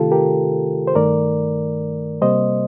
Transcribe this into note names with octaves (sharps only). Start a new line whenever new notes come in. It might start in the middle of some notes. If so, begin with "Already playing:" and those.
Already playing: C3 D#3 A3 F4 G4 A4
G4 A#4
C5
G2 D#3 A3 A#4 D5
C3 G3 A#3 C5 D#5